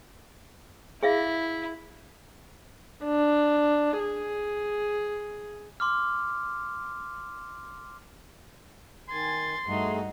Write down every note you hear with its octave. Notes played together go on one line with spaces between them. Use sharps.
E4 G#4 E5 F5
D4
G#4
C6 D6 F6
D#3 G#5 C6 G#6 A6
G2 A3 D#4 F#4 G#4